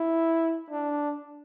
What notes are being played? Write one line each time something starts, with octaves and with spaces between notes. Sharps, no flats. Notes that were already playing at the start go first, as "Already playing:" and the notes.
Already playing: E4
D4